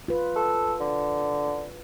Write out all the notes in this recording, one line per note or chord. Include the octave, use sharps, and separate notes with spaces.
F4 B4
A4
D3